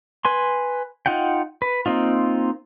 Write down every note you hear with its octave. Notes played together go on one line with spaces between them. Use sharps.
B4 G#5 C6
D#4 F4 F#5 G5
B4
A#3 C4 D#4 F4